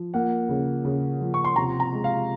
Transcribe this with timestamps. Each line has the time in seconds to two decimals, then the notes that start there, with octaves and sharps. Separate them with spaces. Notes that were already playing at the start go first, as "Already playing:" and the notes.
Already playing: F3
0.14 A#3 F#5
0.49 C#3
0.85 C#3
1.21 F3
1.34 C#6
1.44 C6
1.56 C3 A#5
1.80 A#5
1.92 G#3
2.04 F5